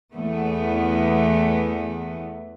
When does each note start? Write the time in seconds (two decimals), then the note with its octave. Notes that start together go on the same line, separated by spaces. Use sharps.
0.14 E2 A3 B3